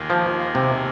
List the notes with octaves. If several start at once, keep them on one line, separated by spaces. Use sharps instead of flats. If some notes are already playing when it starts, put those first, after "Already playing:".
Already playing: D#2 D#3 A#3 F4 G#4
F3
C3